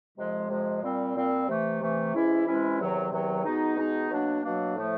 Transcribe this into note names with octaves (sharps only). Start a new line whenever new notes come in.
F2 C3 F3 G#3
F2 C3 F3 G#3
A#2 G3 C4
A#2 G3 C4
C3 E3 A3
C3 E3 A3
C3 E3 G#3 C#4 E4
C3 E3 G#3 C#4 E4
E2 C3 D#3 F#3
E2 C3 D#3 F#3
B2 G#3 B3 D#4
B2 G#3 B3 D#4
B2 F#3 A#3 D4
B2 F#3 A#3 D4
A2 F3 A3